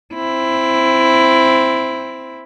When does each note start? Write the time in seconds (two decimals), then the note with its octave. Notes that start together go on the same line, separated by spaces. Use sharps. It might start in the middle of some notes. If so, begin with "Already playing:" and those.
0.14 C4 E4